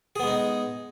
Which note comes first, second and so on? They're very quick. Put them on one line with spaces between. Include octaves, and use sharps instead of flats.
G#4 B3 G#3 D#4